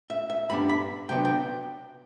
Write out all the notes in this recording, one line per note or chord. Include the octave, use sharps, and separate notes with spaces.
E5
E5
G2 D3 G3 B3 D4 B5
B5
C3 F#3 B3 D4 G5
G5